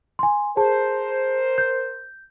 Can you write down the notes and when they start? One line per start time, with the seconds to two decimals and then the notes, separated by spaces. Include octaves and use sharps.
0.19 G#5 C6
0.57 G#4 A#4 C5 A5
1.58 G6